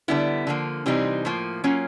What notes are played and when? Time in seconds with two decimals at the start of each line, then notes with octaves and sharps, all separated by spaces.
0.08 D3 G3 B3 E4
0.47 D3 F3 A#3
0.86 C3 E3 G3 C4 D#4
1.25 A2 F3 A#3
1.64 F#3 A#3 C#4 F4